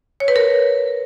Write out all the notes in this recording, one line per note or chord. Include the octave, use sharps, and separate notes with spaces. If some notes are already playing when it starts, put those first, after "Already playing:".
C#5
B4
A#4